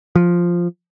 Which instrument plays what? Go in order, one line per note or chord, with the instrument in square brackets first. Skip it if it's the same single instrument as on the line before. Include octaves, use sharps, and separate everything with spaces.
[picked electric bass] F3